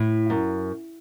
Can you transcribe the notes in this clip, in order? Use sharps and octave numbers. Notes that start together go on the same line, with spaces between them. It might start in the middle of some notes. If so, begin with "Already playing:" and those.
Already playing: A2
F#2